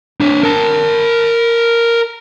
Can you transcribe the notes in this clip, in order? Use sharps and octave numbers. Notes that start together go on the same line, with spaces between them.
D4 C#5
A#4 A5